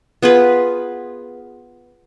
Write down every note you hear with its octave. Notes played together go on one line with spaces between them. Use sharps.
B3 F4 G#4 B4